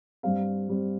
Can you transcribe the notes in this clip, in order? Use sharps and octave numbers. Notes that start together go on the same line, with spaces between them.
G2 G3 C4 F5
G2 G3 C4